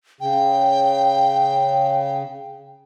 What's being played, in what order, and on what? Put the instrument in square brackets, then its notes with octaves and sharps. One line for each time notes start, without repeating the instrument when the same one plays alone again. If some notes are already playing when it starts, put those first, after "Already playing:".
[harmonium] C#3 [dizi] G5